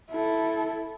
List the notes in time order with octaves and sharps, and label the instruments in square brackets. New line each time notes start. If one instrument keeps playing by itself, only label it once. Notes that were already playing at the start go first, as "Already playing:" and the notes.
[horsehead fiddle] E4 A4